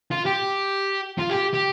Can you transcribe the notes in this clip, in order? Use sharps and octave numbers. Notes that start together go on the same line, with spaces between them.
F4
G4
F4
G4
G4